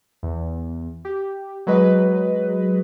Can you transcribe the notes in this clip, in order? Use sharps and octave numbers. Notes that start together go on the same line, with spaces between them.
E2
G4
F#3 G#3 B4 D#5